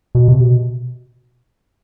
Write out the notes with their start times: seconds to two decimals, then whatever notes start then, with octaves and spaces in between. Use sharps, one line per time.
0.15 B2
0.28 C3
0.41 B2